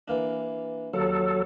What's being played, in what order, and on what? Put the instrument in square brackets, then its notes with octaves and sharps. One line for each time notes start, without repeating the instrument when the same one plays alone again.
[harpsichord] E3 A#3 D4
[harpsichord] D#2 [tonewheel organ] F#3 A4